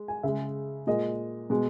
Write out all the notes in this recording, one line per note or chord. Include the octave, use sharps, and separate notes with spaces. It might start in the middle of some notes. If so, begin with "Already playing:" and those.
Already playing: G#3
G#5
C#3 G#3 E5
A#2 G#3 D#5
B2 G#3